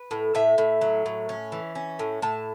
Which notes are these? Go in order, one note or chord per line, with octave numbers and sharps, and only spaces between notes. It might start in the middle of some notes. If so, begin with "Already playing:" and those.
Already playing: B4
A2
A2 E5
A2
F#3
A2
C#4
E3
C#4
A2
A2 A5